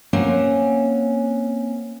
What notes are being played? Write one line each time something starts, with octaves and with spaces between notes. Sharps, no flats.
A#3 C4 C#4 F#5 G#5